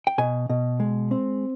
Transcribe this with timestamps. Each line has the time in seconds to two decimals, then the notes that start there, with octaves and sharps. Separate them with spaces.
0.07 G5
0.18 B2 G#5
0.49 B2
0.80 G#3
1.11 C4